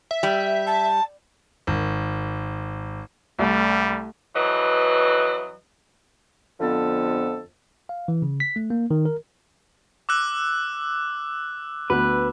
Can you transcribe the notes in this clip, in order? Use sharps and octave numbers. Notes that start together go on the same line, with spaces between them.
E5
G3
A5
G#1
C2 G3 A3
F2 E3 F#3 B4 D#5
F2 D3 F3 B3 A4
F5
E3
C#3
B6
A3
A#3
D#3
A#4
D6 E6 F#6
D2 B3 B4